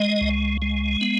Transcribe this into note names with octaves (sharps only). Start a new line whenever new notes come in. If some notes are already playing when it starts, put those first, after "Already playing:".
Already playing: G#3 D#5
C#2
G#3
B3